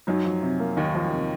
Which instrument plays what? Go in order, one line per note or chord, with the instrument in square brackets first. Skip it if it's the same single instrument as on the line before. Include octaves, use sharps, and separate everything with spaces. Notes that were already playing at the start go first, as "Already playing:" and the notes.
[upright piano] F#2 F#3 [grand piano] D#4
[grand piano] F3
C3
A#3
[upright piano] D#2 D#3 [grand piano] D#4
[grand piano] F3
C3